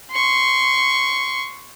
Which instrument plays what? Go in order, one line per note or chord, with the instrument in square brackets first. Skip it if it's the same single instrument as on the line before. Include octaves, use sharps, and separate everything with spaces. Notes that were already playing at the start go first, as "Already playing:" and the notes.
[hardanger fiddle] C6 C#6